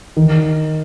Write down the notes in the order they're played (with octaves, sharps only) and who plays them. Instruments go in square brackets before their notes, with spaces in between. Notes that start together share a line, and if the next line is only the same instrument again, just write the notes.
[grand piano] D#3